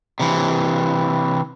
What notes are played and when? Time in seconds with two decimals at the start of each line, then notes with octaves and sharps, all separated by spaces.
0.20 C3 E3